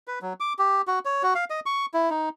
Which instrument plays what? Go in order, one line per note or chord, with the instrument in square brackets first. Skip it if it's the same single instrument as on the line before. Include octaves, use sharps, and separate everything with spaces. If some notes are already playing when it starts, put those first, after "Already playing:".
[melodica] B4
F#3
D6
G4
F#4
C#5
F#4
F5
D#5
C#6
E4
D#4